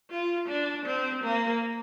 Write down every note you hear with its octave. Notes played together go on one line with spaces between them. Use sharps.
F4
D4
C4
A#3